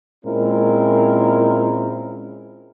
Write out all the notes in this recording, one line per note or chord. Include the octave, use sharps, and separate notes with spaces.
A#2 G#3 C4 C#4 E4 A#4